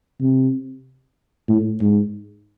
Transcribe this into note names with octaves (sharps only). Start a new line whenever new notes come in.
C3
A2
G#2